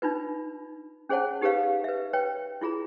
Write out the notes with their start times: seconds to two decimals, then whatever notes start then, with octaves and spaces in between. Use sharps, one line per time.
0.02 D4 D#4 F4 B4
1.09 C#4 G#4 C5 C#5 F#5 A5
1.41 D#4 G4 A4 B4 C#5 F5
1.84 B4 E5
2.13 B4 C#5 G5
2.61 E4 F4 G#4 A#5